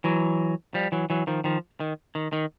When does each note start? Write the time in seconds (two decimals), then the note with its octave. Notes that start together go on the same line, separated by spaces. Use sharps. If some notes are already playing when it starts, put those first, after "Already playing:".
0.04 E3 F#3
0.74 F3 G3
0.92 E3 F#3
1.10 E3 F#3
1.27 D#3 F3
1.44 D#3 F3
1.80 D#3
2.15 D#3
2.33 D#3